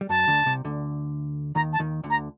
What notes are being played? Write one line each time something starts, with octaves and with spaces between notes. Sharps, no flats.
G3
F#2 F#3 A5
D2 D3
C2 C3
D2 D3
D#2 D#3 A#5
A5
D#2 D#3
D2 D3
A#5